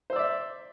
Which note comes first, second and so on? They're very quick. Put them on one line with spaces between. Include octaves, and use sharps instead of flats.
C5 E6 D5 E5